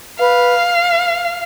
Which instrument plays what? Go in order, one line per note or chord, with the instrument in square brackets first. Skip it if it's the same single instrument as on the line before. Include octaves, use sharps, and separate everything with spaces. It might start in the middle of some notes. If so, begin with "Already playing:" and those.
[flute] B4 [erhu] F5